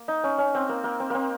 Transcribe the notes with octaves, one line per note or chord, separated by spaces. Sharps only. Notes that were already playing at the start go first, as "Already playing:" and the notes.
Already playing: A#3
D#4
C#4
C#4
C4
A#3
A#3
C4
A#3 C4